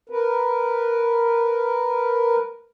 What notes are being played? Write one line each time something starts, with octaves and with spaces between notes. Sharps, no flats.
A#4 B4